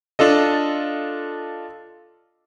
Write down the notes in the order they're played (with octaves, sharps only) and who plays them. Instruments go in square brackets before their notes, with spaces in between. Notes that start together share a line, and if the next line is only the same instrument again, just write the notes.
[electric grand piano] D4 F4 A4 D#5